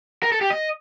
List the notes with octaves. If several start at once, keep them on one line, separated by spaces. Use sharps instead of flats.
A#4
A4
G4
D#5